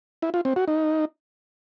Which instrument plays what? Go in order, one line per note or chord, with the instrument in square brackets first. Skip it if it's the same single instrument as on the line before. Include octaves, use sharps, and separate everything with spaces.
[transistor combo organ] E4
F4
C4
F#4
D#4